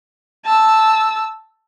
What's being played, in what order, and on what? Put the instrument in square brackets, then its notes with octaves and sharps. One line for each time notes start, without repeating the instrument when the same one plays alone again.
[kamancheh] A5 E6